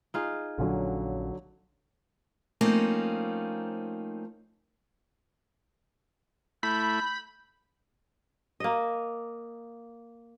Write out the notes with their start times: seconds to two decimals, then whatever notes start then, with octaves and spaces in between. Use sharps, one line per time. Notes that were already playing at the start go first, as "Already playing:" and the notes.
0.14 D#4 F4 G#4
0.58 A#1 A#2 D3 F#3 C#4
2.61 F3 A3 A#3 C4 C#4 D#4
6.63 A3 E4 B5 G6
8.60 A#3 D#5